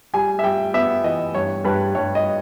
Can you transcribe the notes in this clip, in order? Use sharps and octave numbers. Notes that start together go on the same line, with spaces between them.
G3 G#5
E5
G3 G5
B3 E5
E3 D#5
G2 C#5
G2 B4
G2 C#5
D#5